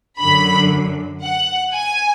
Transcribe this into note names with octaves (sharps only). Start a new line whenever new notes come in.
F#2 D3 F#3 B5
F#5
G#5